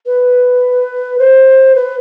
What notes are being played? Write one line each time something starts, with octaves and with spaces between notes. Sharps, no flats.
B4
C5
B4